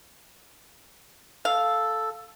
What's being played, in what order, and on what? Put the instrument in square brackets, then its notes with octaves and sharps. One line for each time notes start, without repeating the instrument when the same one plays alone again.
[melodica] A4 [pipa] F5